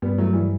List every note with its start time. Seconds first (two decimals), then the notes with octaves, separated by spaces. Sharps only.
0.02 G2 G3 B3
0.18 F#3 A3
0.33 E3 G3